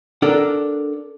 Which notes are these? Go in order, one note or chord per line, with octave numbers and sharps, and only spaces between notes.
D4 A4 A#4 F#5